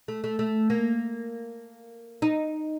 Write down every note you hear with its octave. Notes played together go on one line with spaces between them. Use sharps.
A3
A3
A3
A#3
D#4